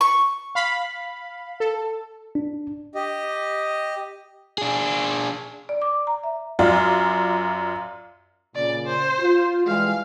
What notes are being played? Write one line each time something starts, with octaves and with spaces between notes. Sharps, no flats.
C#6
F5 B5
A4
D4
G4 D#5
D4 G#4
D5
D6
A#5
E5
F#2 F4 D5
A#2 C#3 D5
C5
F4
E3 G3 G#3 F5